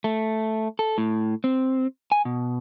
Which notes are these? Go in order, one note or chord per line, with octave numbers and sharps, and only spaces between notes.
A3
A4
A2
C4
G#5
B2